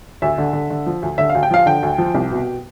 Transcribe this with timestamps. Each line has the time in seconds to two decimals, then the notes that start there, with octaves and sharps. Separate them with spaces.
0.22 D2 E5
0.38 D3
0.53 D3
0.70 D3
0.86 F3
1.02 D2
1.18 D3 E5
1.30 F5
1.35 D2
1.43 G5
1.51 F3 F5
1.66 D3 G5
1.83 D2
1.98 F3
2.14 C2
2.31 B2